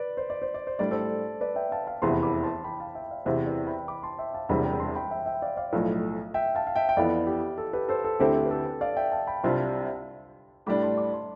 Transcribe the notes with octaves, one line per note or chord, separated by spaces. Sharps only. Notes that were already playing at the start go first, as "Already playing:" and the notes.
Already playing: B4 D5
C5
D5
C5
D5
C5
A2 G3 D4 D5
A4 C5
B4 D5
E5 G5
F5 A5
F5 A5
F1 E2 C3 E3 B3 A5 C6
B5 D6
A5 C6
G5 B5
F5 A5
E5 G5
D5 F5
E2 C3 E3 C5 E5
B4 D5
G5 B5
B5 D6
A5 C6
E5 G5
F5 A5
E1 E2 C3 G3 G5 B5
G5 B5
A5 C6
G5 B5
E5 G5
E5 G5
D5 F5
D5 F5
B1 A2 F3
E5 G5
F5 A5
F5
E5 G5
G5
F2 E3 B3 D5 F5
G4
A4
G4 B4
A4 C5
A4
D2 D3 A3 C4 E4 G4
G4
B4
A4
D5 F5
E5 G5
F5 A5
G5 B5
C2 C3 G3 D4 F4 A5 C6
A2 G3 D4 B5 D6
A5 C6
B5 D6
A5 C6